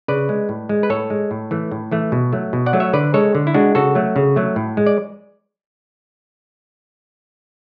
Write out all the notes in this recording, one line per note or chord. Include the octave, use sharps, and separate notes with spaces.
C#3 B4 D5
G#3
A2
G#3
B4
A2 A4 C#5
G#3
A2
E3 A3
A2
E3 A3
B2
F#3 A3
B2
D5 F#5
F#3 A3
C#5 E5
D3 B4 D5
G#3 A4 C#5
D3
E4
G#3 D4 F#4
C#3 F#4 A4
F#3 A3
C#3
F#3 A3
A2
G#3
D5